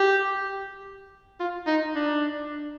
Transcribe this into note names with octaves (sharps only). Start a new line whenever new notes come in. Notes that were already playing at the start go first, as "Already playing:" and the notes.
Already playing: G4
F4
D#4
D4